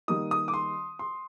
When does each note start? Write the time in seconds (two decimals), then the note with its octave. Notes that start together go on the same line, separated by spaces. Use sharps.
0.08 D#3 G3 A#3 D#4 D#6
0.31 D#6
0.48 D6
0.54 C6
0.99 C6